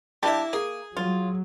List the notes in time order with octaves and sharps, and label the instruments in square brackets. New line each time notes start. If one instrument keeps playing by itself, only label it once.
[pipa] G3 D4 G4 [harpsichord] A#3 E4 E5
[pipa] A#3 [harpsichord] G#4
[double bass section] F#3 [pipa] F4